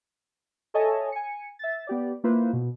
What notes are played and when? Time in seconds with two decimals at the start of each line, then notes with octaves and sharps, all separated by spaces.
0.74 A4 C#5 D#5 E5 G#5 A5
1.12 G#5 C#7
1.59 E5 A6
1.87 B3 G4 D5
2.24 A#3 E4 F4 B4 C5
2.53 B2